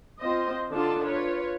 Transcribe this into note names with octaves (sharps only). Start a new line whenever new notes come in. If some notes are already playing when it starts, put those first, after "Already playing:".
C4 F4 C5 D#5
D3 D4 D#4 F4 A4 A5
F4 B4 C#5